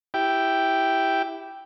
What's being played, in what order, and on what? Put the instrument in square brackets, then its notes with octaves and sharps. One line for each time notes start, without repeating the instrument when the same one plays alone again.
[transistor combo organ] E4 G4 G5